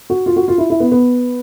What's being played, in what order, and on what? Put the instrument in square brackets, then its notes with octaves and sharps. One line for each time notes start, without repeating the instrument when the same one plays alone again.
[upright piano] F#4
F4
F#4
F4
E4
E4
B3
B3